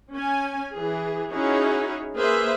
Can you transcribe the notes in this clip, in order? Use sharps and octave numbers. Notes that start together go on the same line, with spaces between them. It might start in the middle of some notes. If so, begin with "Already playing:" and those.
C#4 G#5
E3 G#4
C#4 D#4 E4 F#4 G#4 C#5
A#3 G#4 B4 C5 E5